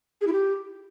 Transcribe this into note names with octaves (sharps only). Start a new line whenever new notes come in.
G#4
E4
G4